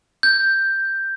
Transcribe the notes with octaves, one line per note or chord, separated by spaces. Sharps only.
G6